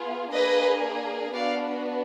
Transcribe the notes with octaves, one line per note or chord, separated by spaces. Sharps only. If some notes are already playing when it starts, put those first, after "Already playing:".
Already playing: B3 F4 G#4
A#3 D4 G#4 B4 D#5
B3 D4 F#4 D5 F5